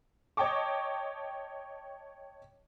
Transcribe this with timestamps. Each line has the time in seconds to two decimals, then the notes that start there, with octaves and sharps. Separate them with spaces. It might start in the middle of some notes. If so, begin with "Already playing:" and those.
0.37 C#5 D#5 G5 A5 C#6 D6